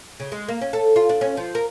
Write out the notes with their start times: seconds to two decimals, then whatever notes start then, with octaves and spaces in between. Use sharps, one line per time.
0.20 C#3
0.32 G#3
0.48 A#3
0.61 C#4
0.73 A4
0.96 F4
1.09 D4
1.21 C#4
1.37 F3
1.55 A#4